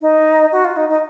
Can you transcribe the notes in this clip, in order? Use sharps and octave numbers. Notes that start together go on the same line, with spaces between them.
D#4
F#4
F4
D#4
D#4